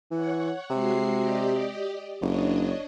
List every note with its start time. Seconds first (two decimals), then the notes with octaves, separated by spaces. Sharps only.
0.11 E3 C#5 F#5
0.70 C3 G#3 F#4 C7
1.20 G4 D5 D#5
2.21 F#1 D4 C#5 D#5